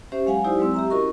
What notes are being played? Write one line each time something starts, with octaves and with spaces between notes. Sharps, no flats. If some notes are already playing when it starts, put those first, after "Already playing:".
C#4 G4 C5 E5
F#3 G#3 F5 F#5 G#5
D#4 E4 G4 C5 D5
F#3 G#3 C4 E6
G4 E5 A#5
C#4 E4 F#4 A#4 D#5 C#6